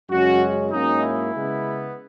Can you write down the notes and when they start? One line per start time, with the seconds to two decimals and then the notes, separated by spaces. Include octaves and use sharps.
0.09 F#2 C#3 G#3 C#4 F#4
0.71 G#2 F#3 A#3 C#4 D#4
1.02 E4
1.33 C#3 G#3 B3